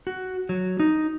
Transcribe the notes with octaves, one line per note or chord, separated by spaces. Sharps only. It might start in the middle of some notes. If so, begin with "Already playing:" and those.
F#4
F#3
D#4